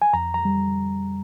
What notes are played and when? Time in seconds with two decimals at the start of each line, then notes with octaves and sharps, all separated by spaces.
0.02 G#5
0.13 F2 A#5
0.34 A#5
0.45 G3